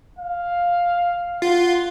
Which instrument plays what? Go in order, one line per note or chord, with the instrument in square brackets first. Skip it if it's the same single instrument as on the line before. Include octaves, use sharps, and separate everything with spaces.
[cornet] F5
[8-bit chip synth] F4 [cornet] F#5